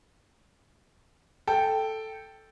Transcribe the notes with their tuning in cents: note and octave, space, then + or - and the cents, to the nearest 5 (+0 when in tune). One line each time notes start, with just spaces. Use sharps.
A4 +0 G5 +0